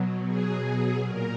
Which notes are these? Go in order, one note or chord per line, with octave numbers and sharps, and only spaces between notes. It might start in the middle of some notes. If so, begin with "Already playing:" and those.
Already playing: B2 F#3
G#4
A#2 A#4